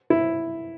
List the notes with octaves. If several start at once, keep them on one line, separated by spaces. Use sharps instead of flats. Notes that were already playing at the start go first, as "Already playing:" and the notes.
E4